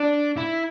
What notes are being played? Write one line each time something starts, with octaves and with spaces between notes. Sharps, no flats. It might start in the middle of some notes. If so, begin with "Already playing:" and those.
Already playing: D4
E4